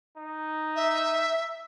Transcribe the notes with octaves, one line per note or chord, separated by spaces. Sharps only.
D#4
E5